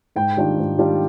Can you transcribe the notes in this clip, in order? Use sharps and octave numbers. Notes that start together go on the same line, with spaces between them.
G#2 G5
D#3 G3 D4 F4
G#2
D#3 G3 D4 F4